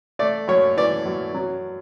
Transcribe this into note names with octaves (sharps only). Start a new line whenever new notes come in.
A3 D5
F#2 C#5
E3 D5
F#2
F#3